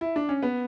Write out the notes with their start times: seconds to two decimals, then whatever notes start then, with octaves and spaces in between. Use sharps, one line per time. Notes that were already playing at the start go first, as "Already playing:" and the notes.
0.01 E4
0.16 D4
0.29 C#4
0.43 B3